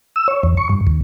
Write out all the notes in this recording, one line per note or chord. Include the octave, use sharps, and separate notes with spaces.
E6
C#5
E2
C#6
G2
D#2